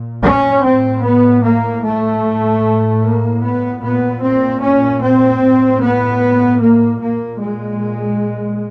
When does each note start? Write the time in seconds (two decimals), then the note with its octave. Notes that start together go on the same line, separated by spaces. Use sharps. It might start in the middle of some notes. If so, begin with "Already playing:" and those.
Already playing: A#2
0.22 C#4
0.62 A2 C4
1.02 B3
1.43 A#3
1.82 A3
2.22 A2
3.02 A#3
3.42 B3
3.81 A#2 B3
4.22 C4
4.61 C#4
5.01 C4
5.41 A2
5.81 B3
6.61 A#3
7.00 A#2 A#3
7.40 G#3